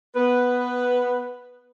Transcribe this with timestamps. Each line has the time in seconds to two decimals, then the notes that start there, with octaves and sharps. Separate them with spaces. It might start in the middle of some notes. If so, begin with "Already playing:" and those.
0.16 B3 B4